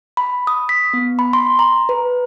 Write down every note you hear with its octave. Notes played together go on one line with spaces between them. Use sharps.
B5
D#6
B6
B3
B5
C6
A#5
B4